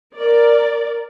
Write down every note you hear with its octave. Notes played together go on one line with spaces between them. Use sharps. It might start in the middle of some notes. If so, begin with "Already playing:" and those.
A#4 D5